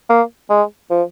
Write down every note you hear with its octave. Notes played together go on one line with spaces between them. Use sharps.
A#3
G#3
F3